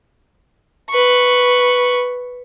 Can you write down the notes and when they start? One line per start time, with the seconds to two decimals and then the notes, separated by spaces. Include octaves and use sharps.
0.90 B4 C#6